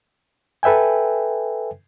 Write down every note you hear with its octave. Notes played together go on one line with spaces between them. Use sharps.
A4 B4 E5 G5 G#5